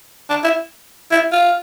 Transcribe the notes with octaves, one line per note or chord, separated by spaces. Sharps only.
D4
E4
E4
F4